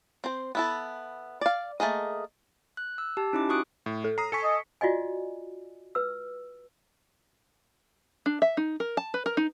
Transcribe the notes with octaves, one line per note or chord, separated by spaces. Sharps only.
C4 C5
B3 E4 A4
D5 F5
A3 A#3 G#4 D#5
F#6
E6
G4 A5
C#4 D#4 E4 G4 D6
F#4 C#6 D#6 F#6 D7
A2
A4
A#5 D#6 C7
A4 G#5 C#6 B6 C#7
D#5
F4 F#4 D5 D#5 G#5
B4 E6
D4
E5
D#4
A#4
A5
B4
A#4
D#4